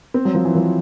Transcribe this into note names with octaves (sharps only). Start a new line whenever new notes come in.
C4
F#3
F3
E3
F3